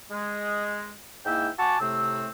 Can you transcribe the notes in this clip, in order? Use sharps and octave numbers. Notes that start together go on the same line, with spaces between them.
G#3
G#2 A#3 E4 E5 G5 E6
F#4 F#5 G#5 A5 C#6 D6
A2 C3 A3 C4 E6